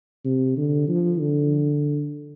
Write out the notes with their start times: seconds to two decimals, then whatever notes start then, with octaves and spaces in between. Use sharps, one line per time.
0.25 C3
0.57 D3
0.88 F3
1.20 D3